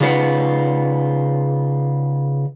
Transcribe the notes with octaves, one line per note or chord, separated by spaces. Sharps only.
C#3 D#4 F4 B4 F#5